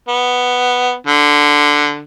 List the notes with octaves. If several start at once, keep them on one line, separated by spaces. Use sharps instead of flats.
B3
D3